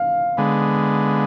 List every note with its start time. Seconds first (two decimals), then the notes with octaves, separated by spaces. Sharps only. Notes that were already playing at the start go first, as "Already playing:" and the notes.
Already playing: F5
0.37 D3 G#3 B3